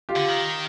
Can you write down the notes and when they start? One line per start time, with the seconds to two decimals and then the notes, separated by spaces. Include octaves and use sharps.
0.09 F4 G4
0.16 D3
0.28 D#3